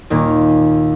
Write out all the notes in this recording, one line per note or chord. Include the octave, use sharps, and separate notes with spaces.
D#2 A#2 A#3